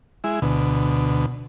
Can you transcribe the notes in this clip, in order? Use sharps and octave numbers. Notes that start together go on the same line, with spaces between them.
G#3 E4
D2 B2